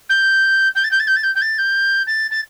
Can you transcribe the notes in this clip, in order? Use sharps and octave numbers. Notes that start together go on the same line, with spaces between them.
G6
G6
A6
G6
A6
G6
A6
G6
G6
A6
G6
A6
A6